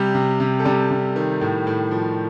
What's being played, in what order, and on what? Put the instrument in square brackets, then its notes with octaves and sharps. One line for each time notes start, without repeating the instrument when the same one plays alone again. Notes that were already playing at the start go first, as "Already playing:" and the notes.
Already playing: [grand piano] C3 G3 G4
C3
C3
A4
C3 G3 G4
C3
D#3
A2
A2
F3